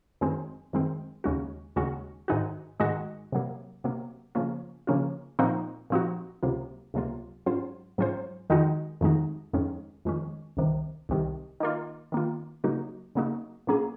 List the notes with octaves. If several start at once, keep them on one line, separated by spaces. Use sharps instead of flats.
F#2 D#3 G#3 C4
F#2 D#3 G#3 C4
D#2 C#3 G#3 C#4 F#4
D#2 C#3 G#3 C#4 F#4
G#2 D#3 G#3 D#4 F#4
G#2 D#3 G#3 D#4 F#4
C3 F#3 A#3
C3 F#3 A#3
C#3 F3 A#3 C#4 F4
C#3 F3 A#3 C#4 F4
A#2 F3 C4 D#4 F#4
A#2 F3 C4 D#4 F#4
C#2 C3 F#3 A#3 F4
C#2 C3 F#3 A#3 F4
G#2 F#3 C#4 F4 C5
G#2 F#3 C#4 F4 C5
F2 D#3 G#3 D#4 F#4
F2 D#3 G#3 D#4 F#4
F2 D#3 G#3 C#4
F2 D#3 G#3 C#4
C2 C3 D#3
C2 C3 D#3
D#3 A#3 F4
D#3 A#3 F4
C#3 F#3 A#3 D#4 F#4
C#3 F#3 A#3 D#4 F#4
A#2 F#3 A#3 C#4 G#4